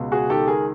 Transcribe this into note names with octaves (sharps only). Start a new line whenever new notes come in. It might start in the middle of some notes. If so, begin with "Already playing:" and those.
Already playing: C#2 B2
F#4 G#4
D#3 G4 A4
G#4 A#4